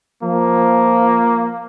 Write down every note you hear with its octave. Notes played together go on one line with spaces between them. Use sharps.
F3 A#3